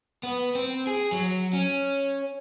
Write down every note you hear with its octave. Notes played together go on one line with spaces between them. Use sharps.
B3
C4
G#4
F#3
C#4